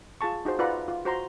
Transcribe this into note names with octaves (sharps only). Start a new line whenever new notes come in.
F4 G#4 A5 C#6
D#4 F#4 G#4 C5
F4 B4 D5 F#5 A#5 B5
E5
F4
F#4 C5 A#5 C6